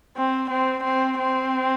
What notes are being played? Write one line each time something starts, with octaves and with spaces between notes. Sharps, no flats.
C4
C4
C4
C4